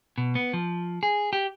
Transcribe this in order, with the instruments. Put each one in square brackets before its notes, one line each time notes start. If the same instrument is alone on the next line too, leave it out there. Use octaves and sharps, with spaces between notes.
[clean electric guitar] B2
B3
F3
G#4
G4